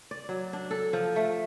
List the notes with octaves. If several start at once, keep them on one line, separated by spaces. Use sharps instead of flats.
D5
F#3
D4
A4
F3
A3